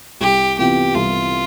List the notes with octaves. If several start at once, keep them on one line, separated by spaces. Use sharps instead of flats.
C2 G4
C3 E3 B3 F4 G4
C2 F4